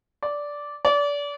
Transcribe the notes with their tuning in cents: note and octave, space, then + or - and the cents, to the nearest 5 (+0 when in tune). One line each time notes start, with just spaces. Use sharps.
D5 -10
D5 -30